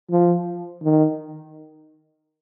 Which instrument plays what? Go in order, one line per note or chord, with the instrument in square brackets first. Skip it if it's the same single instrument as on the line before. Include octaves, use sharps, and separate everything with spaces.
[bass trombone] F3
D#3